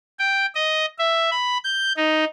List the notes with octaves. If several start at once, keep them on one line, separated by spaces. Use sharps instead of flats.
G5
D#5
E5
B5
G6
D#4